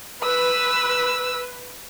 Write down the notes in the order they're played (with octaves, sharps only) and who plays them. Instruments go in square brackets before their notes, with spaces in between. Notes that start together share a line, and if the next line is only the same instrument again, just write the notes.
[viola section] B4 [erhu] E6